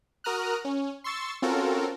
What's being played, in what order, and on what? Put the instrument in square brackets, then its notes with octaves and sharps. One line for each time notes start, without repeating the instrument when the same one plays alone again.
[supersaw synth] F#4 A#4 A#5 D#6 F6 F#6
C#4
C6 C#6 E6 A6
C4 C#4 F4 F#4 A4 A#4